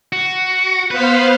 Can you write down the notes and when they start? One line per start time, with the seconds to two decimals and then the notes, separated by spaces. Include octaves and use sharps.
0.12 F#4
0.91 B3 B4 C5 F5